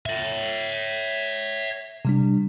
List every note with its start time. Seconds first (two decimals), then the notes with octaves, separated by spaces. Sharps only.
0.06 C#5 E5
2.05 C3 G3 D4